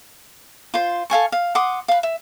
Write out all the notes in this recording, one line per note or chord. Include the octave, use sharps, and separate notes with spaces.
F4 C5
A4 F5 G#5 C#6
F5
F#5 C6 D6 D#6
B4 F5
E5